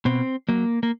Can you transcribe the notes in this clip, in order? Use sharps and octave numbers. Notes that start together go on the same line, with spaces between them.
B2 C4
F#3 A#3
A#3